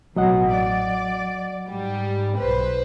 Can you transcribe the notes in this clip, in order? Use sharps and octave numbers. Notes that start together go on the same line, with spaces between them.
A1 B2 F#3 D#5 F#5
D5
G#2 G3
B1 B4 C5